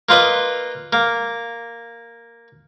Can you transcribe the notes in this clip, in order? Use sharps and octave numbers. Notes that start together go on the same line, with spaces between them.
A#3 F4 B4 D#5
A#3